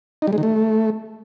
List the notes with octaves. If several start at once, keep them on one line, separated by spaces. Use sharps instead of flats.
D#4
G3
G#3
D#3
A3